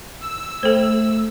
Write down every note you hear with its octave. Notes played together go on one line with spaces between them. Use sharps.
E6
A3 A4 C5